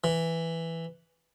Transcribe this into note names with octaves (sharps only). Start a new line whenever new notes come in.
E3